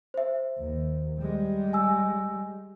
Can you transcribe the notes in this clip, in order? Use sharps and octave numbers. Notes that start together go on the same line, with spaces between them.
C5 E5
D#2
G3 G#3
G#5 E6